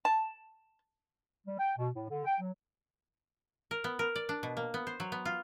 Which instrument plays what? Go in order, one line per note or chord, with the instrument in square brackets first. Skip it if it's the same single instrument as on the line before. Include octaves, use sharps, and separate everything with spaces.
[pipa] A5
[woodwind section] G3
G5
B2
A2
D3
G5
F#3
[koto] A#4
B3
A#4
D5
D4
B2
A#3
B3
C5
F#3
B3
F4